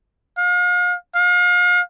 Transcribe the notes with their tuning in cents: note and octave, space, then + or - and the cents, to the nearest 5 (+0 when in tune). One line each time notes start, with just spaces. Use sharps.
F5 +40
F5 +40